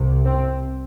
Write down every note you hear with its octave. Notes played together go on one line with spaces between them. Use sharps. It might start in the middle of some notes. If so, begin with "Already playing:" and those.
Already playing: C2 C3
C4